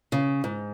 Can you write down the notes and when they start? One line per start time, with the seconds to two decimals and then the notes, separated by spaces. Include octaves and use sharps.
0.12 C#3
0.44 G#2